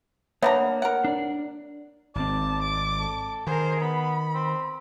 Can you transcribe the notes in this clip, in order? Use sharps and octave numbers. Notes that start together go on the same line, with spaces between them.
A#3 B3 D4 C#5 E5 A#5
A#4 F#5
D4 D5
G#1 C4 D5 A5
D6
A4
D#3 G#4 A#4 C5
B3 B5
C4